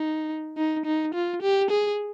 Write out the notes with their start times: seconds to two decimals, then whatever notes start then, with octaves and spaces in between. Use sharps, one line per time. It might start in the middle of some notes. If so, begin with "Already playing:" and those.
Already playing: D#4
0.57 D#4
0.85 D#4
1.14 F4
1.42 G4
1.70 G#4